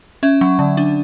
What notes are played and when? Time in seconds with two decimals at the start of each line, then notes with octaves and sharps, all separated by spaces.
0.23 C#4 E5
0.41 F#3
0.59 D3
0.77 D4